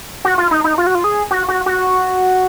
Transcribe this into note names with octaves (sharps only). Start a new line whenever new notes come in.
F#4
F4
D#4
D#4
F4
F#4
F4
G#4
F#4
F#4
F#4